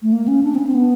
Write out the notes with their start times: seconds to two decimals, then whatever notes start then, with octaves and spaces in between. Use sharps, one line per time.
0.02 A3
0.12 A#3
0.28 C#4
0.43 D4
0.55 C4
0.59 C#4
0.67 C4
0.75 B3